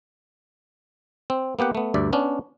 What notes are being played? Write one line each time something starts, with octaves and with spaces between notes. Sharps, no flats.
C4
A#3 B3 G4 F#5
A3 B3
D2 G2 D5 E5
B3 C#4 D4